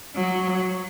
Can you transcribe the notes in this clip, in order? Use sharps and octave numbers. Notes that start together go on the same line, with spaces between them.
F#3